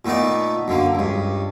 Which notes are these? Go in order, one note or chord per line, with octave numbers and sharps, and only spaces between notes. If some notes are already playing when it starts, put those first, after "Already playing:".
A#2 A3 B3 D#4 D5
F#2 D3 A#3
C#2 G2